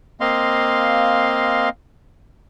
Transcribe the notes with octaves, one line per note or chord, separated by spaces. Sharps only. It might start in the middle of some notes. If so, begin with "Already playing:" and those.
A#3 C4 D#5 F5 C6